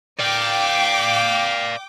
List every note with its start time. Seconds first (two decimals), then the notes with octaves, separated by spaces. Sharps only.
0.20 D5 F5 G5 D6